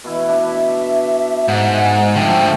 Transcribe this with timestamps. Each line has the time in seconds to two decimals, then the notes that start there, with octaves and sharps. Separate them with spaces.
0.04 B2 E3 E4
0.29 D4 E5
1.48 G#2 F#5
2.16 D3 F3 A3 G5